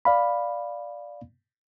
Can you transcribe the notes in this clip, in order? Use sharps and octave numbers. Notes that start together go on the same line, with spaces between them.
D5 F5 B5